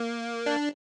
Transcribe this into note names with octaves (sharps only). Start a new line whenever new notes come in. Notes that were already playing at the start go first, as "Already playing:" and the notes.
Already playing: A#3
D4